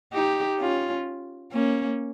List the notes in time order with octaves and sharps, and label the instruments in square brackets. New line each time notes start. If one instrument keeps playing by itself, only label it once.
[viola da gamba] D#4 G4
C#4 F4
A#3 C#4